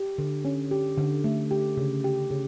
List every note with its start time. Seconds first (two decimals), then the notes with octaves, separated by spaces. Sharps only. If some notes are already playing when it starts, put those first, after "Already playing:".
Already playing: G4
0.18 D3
0.45 C#4
0.71 G4
0.98 D3
1.24 A3
1.51 G4
1.77 C#3
2.04 G4
2.31 C#3